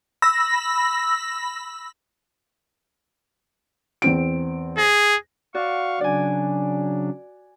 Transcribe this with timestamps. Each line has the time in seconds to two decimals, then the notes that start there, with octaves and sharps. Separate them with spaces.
0.22 B5 E6 A#6
4.02 E2 C4 D7
4.78 G#4 A#6
5.54 F#4 D5 F5 C#6
6.01 C#3 F#3 D4 D5 G#5